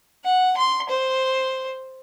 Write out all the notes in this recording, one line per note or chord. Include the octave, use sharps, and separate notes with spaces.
F#5
C6
C5